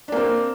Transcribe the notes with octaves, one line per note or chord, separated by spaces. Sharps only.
A#3 C4 D4